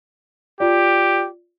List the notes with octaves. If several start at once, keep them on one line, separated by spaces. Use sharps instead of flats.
F4 G4 D5